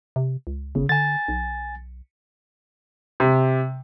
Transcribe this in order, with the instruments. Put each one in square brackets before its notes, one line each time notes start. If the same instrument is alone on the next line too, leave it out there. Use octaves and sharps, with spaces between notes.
[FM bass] C3
C#2
[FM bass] G1 [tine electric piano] C#3
[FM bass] D3 [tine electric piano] G#5 A6
[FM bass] B1
[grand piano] C3